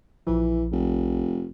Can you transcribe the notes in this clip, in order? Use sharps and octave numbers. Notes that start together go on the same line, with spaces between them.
A#1 E3 F3
F1